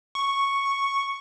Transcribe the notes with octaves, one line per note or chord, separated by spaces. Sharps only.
C#6